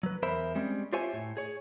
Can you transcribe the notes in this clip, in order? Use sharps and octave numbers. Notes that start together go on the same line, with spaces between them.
F#3 B4
E2 A#4 C5 E5 B5
G3 G#3 C4 C#4
F4 G4 C5 C#5 E5 G#5
A2
G#4 C#5